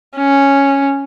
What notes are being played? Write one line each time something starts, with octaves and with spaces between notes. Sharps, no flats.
C#4